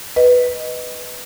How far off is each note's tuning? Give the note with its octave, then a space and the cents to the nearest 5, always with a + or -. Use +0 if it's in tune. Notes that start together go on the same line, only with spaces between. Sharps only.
B4 +0 D#5 +0